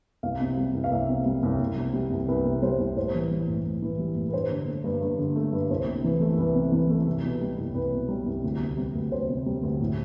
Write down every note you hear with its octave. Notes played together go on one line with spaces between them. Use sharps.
C2 F5
C3
G3
C2
F5
C2 E5
C3
G3
C2
C2
C3
G3
C2
C2 B4
C3
G3 C5
C2
A2 C5
E3
G3
A2
A2
E3
G3
A2
B4
G2 C5
D3
A3
G2
G2
D3
A3
G2
C2 C5
C3
E3
A3
C2 B4
C3
E3
A3
C2
B2
G3
C2
C2 B4
B2
G3
C2
D2
C3
G3
D2
D2 C5
C3
G3
D2
A2